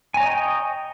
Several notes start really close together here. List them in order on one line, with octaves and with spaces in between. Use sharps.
G#5 A#5 C#5 D#5 G5